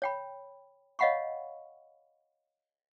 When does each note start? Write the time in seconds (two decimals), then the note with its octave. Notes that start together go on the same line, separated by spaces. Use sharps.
0.02 C#5 G5 B5
0.99 C#5 D#5 F5 F#5 B5 C#6